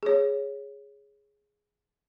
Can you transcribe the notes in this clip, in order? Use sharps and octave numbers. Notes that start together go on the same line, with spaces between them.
G#4 C#5